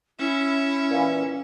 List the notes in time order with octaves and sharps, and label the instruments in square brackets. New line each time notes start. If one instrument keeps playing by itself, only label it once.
[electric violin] C#4 [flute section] E4 [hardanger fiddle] E5
[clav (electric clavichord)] A#2 E3